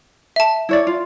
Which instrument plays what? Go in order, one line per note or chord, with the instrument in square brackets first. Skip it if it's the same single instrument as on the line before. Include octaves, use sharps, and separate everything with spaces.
[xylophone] E5 A5
[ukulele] E4 C#5 D5
F4